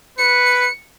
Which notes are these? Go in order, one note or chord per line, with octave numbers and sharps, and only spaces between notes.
B4 C#7